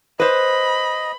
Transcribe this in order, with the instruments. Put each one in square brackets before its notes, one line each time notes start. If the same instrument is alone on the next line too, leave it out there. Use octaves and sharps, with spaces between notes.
[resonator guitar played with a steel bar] B4 C5 [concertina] D#5 [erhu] B5